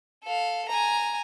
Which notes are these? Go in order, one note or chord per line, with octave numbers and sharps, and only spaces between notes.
A4 F5
G#5 A#5